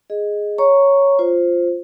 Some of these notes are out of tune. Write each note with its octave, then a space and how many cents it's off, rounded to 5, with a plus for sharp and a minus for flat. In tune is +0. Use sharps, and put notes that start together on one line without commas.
G#4 +0 D#5 +0
C#5 +0 A#5 +0 C#6 +0
F4 +0 C5 +0